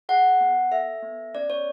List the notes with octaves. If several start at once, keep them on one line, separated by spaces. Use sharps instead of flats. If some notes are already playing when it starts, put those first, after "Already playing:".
G#4 F#5
B3
A4 E5
B3
C#4 D5
C#5